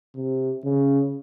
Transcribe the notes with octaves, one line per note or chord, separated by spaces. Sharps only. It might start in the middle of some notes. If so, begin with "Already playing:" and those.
C3
C#3